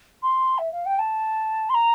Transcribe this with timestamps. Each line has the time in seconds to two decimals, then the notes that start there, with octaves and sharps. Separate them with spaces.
0.23 C6
0.58 E5
0.72 F5
0.86 G5
0.99 A5
1.70 C6
1.74 A#5